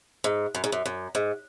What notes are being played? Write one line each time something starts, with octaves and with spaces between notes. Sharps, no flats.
G#2
F#2
G#2
F#2
F#2
G#2